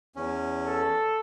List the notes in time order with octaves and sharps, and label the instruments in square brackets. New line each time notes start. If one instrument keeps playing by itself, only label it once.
[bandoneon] E2 C#4
[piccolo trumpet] A4